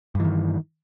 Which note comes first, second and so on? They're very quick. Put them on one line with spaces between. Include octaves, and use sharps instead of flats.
G2 E3 D#3